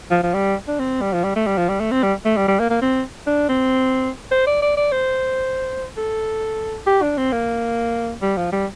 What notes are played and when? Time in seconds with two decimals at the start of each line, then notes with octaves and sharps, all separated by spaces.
0.11 F3
0.23 F3
0.34 G3
0.68 D4
0.79 C4
1.01 G3
1.13 F3
1.24 G3
1.36 A3
1.47 G3
1.57 F3
1.69 G3
1.80 A3
1.91 C4
2.03 G3
2.25 A3
2.37 G3
2.48 G3
2.60 A#3
2.70 A#3
2.81 C4
3.27 D4
3.49 C4
4.31 C5
4.47 D5
4.62 D5
4.77 D5
4.91 C5
5.97 A4
6.87 G4
7.02 D4
7.17 C4
7.32 A#3
8.22 G3
8.37 F3
8.52 G3